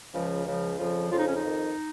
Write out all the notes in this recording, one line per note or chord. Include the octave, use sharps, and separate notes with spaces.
C#2 C#3 F3
C#2 C#3 F3
F2 C#3 F3
F2 C#3 F3 F4
D#4
C#4
D#4
F2 D#3